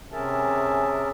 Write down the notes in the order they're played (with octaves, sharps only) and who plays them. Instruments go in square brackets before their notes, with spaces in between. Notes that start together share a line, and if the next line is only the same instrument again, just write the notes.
[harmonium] C3 C#4 G#4 A#4 E5 A5